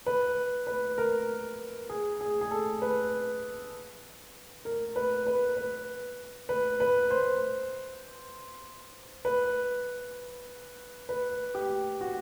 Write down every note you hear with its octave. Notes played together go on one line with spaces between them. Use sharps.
B4
B4
A#4
G#4
G#4
G#4
A4
B4
A#4
B4
B4
B4
B4
B4
C5
B4
B4
G4
F#4